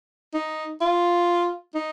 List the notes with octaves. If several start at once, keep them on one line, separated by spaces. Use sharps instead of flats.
D#4
F4
D#4